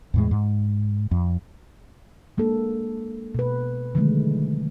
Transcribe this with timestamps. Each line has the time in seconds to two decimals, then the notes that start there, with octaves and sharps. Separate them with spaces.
0.14 E2 A2 G#3
0.31 G#2
1.11 F2
2.38 G#3 A#3 D4 A4
3.35 B2 B4
3.95 D3 D#3 F3 F#3 G#3 A3